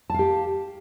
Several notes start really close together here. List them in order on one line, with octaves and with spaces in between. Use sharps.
A5 F5 G4